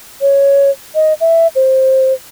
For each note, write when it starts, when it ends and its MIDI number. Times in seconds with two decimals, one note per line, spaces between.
0.21 0.71 73
0.95 1.13 75
1.21 1.47 76
1.56 2.13 72